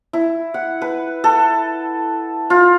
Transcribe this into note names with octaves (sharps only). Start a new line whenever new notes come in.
E4
F#5
B4
A4
F4